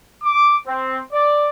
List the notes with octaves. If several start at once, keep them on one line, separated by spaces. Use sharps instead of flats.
D6
C4
D5